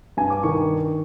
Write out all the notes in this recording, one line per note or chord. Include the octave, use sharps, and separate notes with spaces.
G2 G#5
D6
D#3 C#6